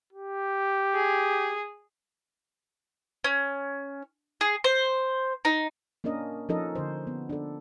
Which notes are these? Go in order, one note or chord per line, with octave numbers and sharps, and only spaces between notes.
G4
G#4
C#4
G#4
C5
D#4
A#3 C#4 D4 A#4 D#5
F3 C#4 D#4 A4 A#4 D#5
D3 C5
B3
D4 A4